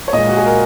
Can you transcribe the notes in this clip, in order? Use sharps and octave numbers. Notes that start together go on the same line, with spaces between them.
C#5
A#2 G#3 D#5
F#4
G#4
A#4